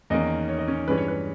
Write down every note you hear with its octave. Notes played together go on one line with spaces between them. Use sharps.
E2 D#3 A#3 C#4 D#4 D#5
C#5
D#5
C#4 C#5
G2 E3 G#3 C#4 B4
C#5
B4